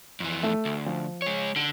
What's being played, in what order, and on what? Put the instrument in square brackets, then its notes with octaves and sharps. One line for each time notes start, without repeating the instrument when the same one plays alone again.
[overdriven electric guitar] F2 E3
[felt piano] A3
[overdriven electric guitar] D2
[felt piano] F3
[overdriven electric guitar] G#3 C#5
[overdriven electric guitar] D3 [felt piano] D7